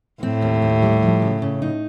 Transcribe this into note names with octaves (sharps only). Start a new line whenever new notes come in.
A2 C4
D#2
D#2
G3
F3
C#3
C#3
D#4